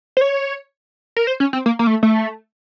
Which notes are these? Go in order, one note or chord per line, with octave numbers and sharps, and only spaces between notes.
C5
C#5
A#4
C5
C#4
C4
A#3
A#3
A3
A3